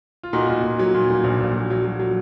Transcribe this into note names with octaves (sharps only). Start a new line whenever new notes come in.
F4
A#2 D#4 F#4
A#2
A#2
F#3
A#2
A#2
A#1
A#1
F#3
F#3
F#3
F#3